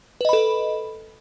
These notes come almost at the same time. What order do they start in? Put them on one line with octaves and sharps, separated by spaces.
B4 D#5 B5 A4